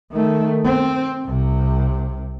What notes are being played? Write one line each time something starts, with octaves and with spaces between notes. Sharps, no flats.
D#3 A3
C4
C2 C3